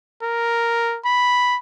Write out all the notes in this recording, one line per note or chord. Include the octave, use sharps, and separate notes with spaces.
A#4
B5